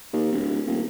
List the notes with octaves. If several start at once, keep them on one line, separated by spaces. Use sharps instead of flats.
D#2
D1
D#1